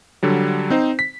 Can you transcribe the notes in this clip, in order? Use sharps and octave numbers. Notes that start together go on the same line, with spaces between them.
D3 F#3 G3
C4 D#4 C5
B6